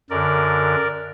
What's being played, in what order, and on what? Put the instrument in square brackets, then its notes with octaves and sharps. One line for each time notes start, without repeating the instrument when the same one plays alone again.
[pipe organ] F#2 D3 A#4 D5